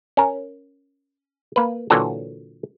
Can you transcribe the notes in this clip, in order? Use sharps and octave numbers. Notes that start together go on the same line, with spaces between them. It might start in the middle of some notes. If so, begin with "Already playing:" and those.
C#4 A#4
A#3 B4
A#2 D3 E3 F#3 F#4 A4